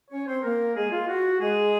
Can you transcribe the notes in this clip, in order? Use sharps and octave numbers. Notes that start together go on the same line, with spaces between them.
C#4 C#5
C4 C5
A#3 A#4
G#3 G#4
F4
F#4
G#3 G#4